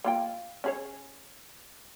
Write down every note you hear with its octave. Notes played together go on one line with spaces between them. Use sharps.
A#3 F4 G5
C#4 G#4 C#5